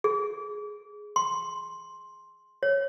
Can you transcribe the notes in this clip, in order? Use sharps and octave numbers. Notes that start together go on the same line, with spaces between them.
G#4
C6
C#5